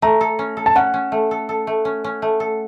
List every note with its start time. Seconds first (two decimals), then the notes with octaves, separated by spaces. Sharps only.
0.02 A3 A#5
0.21 A4
0.39 C#4
0.57 A4
0.66 A5
0.76 C#4 F#5
0.94 C#4
1.12 A3
1.31 A4
1.49 A4
1.67 A3
1.85 C#4
2.04 C#4
2.22 A3
2.40 A4